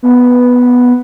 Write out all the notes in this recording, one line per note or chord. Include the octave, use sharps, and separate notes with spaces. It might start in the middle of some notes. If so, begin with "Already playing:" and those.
B3